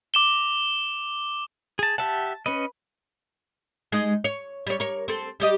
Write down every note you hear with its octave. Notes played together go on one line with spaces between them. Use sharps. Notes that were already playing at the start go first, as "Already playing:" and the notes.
D6 E7 G7
G#4 A5
G4 E5 F#5 A5
C#4 B4 D#5
G#3 D#4
C#5
G3 C#5
A#4 C#5
C4 A4
G3 G4 D#5